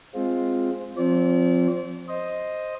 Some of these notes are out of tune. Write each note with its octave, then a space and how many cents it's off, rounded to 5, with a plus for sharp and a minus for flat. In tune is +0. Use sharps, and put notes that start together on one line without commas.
G#3 +0 C4 +0 F4 +0
F3 +0 C4 +0 D5 -40
C5 +0 D#5 +0